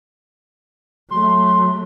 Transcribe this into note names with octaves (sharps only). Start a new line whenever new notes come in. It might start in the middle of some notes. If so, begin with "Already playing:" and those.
F#3 A3 C6